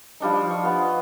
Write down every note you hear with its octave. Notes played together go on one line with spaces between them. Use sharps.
F3 G3 D4 D#4
F3
C#6
B3 F4
D#5